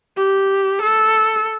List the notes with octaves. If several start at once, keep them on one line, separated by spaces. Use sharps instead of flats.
G4
A4